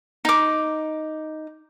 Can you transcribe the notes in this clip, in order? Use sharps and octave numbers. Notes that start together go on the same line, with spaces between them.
D#4 D6